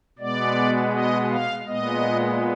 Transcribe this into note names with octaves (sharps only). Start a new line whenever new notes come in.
B2 G#3 B3 D5
D#5
F5
A#2 G#3 B3 D#5